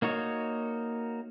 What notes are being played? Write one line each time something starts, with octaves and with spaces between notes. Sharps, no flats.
A#3 D#4 F#4 C#5